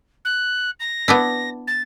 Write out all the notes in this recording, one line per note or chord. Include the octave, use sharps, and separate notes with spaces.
F#6
A#6
B3 D4 E4
A6